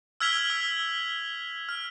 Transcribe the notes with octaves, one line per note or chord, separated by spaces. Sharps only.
E6 F6 G#6 B6 F7 G7
E6
F6